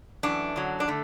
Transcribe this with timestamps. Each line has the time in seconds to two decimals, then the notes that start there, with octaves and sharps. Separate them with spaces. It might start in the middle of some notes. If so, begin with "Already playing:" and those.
0.23 F#2 E3 A3 D4
0.56 F#2 D3 F#3
0.80 D4
0.88 D3 A3